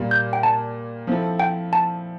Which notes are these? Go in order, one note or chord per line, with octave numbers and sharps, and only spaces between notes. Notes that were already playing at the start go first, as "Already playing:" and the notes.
Already playing: A#2 G3 A#3
G6
G5
A5
F3 C4 E4 A4
G5
A5